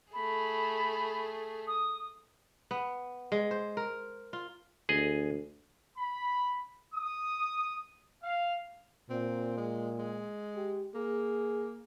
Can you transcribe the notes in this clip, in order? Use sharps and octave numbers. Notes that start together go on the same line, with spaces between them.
A3 G#4 B5
D#6
B3
G#3
C5
A#4
F4
D2 G#4 D#5
B5
D#6
F5
A#2 C4
G#3
G#3
G4
A#3 G#4